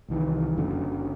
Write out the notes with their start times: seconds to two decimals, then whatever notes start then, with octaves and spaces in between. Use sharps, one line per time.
0.09 C2 D#3 E3
0.58 F#1 F#2 D3